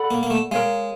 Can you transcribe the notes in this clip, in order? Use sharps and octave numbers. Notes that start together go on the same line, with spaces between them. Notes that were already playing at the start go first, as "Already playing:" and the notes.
Already playing: A4 D5 F#5 B5
A#3
A#3
A3
G#3 A#4 C#5 F5